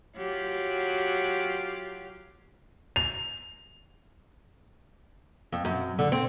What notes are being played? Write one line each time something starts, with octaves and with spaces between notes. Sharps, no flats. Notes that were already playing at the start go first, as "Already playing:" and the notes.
F#3 F4 G4
F7
F2
F#2
D3
C4